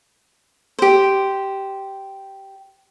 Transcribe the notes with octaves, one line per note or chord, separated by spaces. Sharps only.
G4 C5